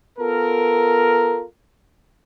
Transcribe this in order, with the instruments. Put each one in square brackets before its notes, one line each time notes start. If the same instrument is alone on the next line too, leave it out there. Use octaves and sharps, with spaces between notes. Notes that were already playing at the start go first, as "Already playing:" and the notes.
[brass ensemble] B3 F4 A4 A#4